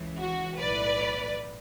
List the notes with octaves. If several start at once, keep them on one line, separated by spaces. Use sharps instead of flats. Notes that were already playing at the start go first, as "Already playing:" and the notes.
Already playing: C#2 C#3 E3
F#4
B1 A2 E3 B4 D5